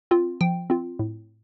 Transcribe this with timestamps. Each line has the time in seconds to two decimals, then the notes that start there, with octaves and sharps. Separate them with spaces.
0.11 C4 F4
0.41 F3 G5
0.70 C4 F4
0.99 A2